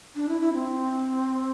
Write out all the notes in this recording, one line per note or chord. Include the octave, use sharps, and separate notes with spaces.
D4
E4
E4
C4